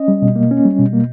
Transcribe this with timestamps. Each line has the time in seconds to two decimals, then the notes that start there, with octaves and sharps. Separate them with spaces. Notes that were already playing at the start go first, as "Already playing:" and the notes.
Already playing: C#4 D#5
0.08 G3
0.22 B2
0.36 A#3
0.51 C#4
0.65 G3
0.79 B2
0.93 A#3